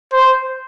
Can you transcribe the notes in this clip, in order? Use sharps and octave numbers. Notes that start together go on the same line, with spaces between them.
C5